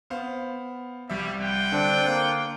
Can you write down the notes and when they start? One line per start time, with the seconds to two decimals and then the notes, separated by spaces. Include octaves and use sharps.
0.10 B3 C5 F5
1.10 C2 G3 E5
1.41 F4 F#5 G5
1.72 D3 C4 D4
2.07 A#3